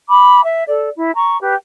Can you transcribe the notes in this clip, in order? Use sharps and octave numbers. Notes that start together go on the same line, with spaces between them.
B5 D6
E5
A4 D5
E4
A#5 C#6
G4 B4